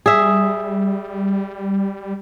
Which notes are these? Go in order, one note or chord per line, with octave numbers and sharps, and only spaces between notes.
G3 G#4 E5